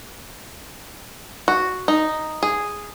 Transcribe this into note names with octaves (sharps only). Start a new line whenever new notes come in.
F#4
D#4
G#4